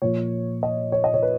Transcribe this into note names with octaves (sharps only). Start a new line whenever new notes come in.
A#2 F3 C#5
D#5
C#5
D#5
C#5
B4